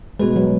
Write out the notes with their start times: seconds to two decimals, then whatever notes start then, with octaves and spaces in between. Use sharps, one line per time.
0.19 B2 G#3 B3 F#4 B4
0.36 F#3